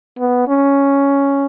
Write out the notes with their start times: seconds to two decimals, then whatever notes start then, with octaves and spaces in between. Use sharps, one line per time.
0.18 B3
0.48 C#4